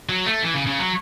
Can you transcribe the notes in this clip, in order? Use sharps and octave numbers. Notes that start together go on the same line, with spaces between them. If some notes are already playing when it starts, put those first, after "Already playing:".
F#3
A3
E3
C#3
C#3
F#3